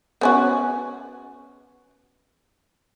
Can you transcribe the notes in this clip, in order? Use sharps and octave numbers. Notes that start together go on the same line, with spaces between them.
B3 C#4 F#4